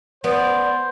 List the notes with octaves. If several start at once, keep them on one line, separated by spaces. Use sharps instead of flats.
B3 C5 D5